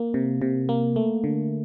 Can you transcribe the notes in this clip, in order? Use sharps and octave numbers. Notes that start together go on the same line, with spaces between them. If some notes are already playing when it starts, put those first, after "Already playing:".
Already playing: A#3
C3
C3
A#3
A3
D3